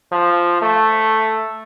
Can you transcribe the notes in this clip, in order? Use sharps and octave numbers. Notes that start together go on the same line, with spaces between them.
F3
A3